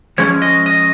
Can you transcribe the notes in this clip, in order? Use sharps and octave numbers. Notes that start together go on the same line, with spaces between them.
F3 G#3 C#4 C#5
D#5
D#5